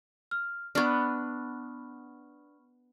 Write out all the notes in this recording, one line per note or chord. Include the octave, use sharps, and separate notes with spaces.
F6
B3 D4 B5 C#6 F6